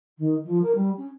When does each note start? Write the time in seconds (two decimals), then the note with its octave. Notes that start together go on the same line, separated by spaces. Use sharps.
0.18 D#3
0.44 F3
0.62 A#4
0.75 G3
0.97 C#4